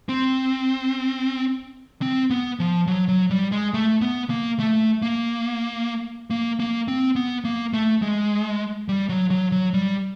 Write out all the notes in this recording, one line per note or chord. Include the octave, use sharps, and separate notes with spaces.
C4
C4
B3
F3
F#3
F#3
G3
G#3
A3
B3
A#3
A3
A#3
A#3
A#3
C4
B3
A#3
A3
G#3
G3
F#3
F#3
F#3
G3